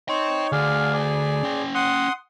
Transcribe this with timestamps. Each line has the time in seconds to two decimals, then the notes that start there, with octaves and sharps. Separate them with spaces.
0.09 D#4 C#5 G5 C6
0.52 D2 G#4 D5 F5
0.93 G#4 D5
1.43 C#4 G5
1.75 F#5 C6 D#6